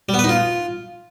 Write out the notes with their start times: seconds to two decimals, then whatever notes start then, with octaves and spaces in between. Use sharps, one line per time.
0.09 G3
0.14 B3
0.19 B4
0.24 D#4
0.29 F4